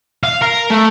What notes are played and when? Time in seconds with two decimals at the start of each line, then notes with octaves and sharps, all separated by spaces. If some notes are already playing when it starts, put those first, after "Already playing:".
0.24 F5
0.42 A#4
0.70 A3